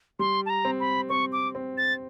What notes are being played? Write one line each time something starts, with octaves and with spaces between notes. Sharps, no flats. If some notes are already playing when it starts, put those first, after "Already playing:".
G3 C6
A5
A#5
C4
B5
C4 C#6
D6
C4
A6